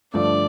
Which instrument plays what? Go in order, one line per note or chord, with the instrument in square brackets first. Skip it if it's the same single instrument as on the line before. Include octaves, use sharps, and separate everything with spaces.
[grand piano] G2 D3 F3 A3 [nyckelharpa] D5